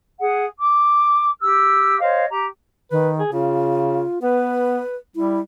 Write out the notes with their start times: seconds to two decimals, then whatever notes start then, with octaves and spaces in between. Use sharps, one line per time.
0.19 G#4 F#5
0.59 D6
1.40 G4 E6 F6
2.00 C5 C#5 D#5 F5
2.29 G4 A#5
2.91 D#3 B4
3.19 G#4
3.33 C#3 F4
4.22 B3 B4
5.16 G3 E4